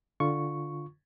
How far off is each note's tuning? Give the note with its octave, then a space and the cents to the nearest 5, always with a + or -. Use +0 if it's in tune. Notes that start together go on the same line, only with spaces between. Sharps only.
D3 +0 F4 -5 C#6 +0